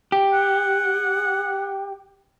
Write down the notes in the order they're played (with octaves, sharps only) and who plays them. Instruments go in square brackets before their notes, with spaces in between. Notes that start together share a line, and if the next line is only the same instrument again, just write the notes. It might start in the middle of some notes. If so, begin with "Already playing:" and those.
[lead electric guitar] G4
[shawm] F#5